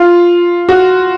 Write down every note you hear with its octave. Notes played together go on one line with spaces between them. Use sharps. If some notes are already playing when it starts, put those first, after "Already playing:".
Already playing: F4
F#4